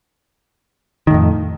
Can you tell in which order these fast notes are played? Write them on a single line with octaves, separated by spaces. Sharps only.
D#3 A2 F2